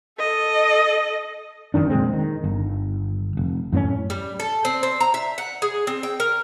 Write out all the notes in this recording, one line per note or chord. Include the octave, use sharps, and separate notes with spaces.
A4 D#5
G1 F#2 D#3 D4
F1 A#2 G#3 C4
D#3
G1
F1
F#2 A2 A3 C#4
G3
A4
C4
C4
A#5
E5
F#5
G#4
C4
G5
A#4